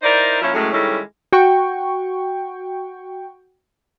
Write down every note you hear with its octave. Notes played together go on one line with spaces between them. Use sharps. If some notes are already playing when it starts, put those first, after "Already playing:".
D#4 E4 A#4 C5 D5
F3 A#3 C#4 E4 F4
F#2 A2 G#3 A3
D#3 G3 G#3 C#4 E4 A4
F#4 G5 C#6